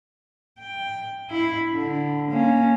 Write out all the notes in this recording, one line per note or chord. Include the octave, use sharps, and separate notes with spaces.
G5
E4
D3
A#3 C#4